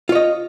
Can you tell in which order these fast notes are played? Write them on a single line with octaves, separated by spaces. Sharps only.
F4 C#5 D#5